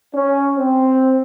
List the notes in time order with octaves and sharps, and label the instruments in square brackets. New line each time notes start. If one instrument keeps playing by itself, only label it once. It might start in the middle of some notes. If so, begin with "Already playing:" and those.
[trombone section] C#4
C4